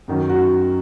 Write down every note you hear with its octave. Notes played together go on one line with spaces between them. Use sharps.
F#2 D#3 F#3
F#4